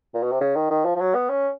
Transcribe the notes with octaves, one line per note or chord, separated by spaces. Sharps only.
A#2
B2
C3
C#3
D#3
D#3
F3
F3
F#3
B3
C#4